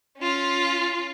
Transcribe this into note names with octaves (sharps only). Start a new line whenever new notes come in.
C#4 F4